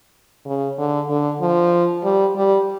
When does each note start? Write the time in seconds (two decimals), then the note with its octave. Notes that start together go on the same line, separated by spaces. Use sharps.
0.46 C#3
0.78 D3
1.10 D3
1.41 F3
2.04 G3
2.36 G3